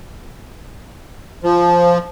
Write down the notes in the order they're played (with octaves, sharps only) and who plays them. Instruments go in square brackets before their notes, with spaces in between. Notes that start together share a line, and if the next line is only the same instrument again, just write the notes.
[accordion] F3